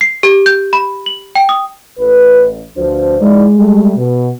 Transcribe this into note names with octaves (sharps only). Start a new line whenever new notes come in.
C7
G4
G6
B5
F#7
G5
D#6
A1 B4
D2 F3 D4 F#4 B4 C5
G#3 D#4 E4 D5
G3 A3
B2